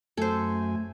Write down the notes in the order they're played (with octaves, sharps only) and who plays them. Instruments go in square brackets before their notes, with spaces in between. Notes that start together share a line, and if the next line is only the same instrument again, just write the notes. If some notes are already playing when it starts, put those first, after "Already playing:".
[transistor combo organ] F#2 G#5 [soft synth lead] A3 [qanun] A4 C5